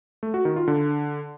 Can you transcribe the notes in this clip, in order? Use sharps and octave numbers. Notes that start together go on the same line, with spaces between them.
A3
F#4
D#3
F4
D3